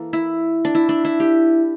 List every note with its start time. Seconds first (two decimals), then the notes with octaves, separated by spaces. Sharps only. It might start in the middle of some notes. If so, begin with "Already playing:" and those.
Already playing: E3 A#3 A4
0.13 E4
0.65 D4
0.75 E4
0.89 D4
1.05 E4
1.20 G4